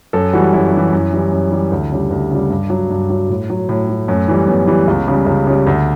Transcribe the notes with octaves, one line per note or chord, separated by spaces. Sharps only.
F#2 A4
E3 G3 F#4
F#2 E4
G3
E3
F#2
E3 G3
F#2
E3 G3
D2
C#3 G3
D2
C#3 G3
G2
F#3
G2
F#3
A2
F#3
A2
F#3
F#2 A3
E3 G3
F#2 B3
E3 G3
C#2
C#3 G3
C#2
C#3 G3
D2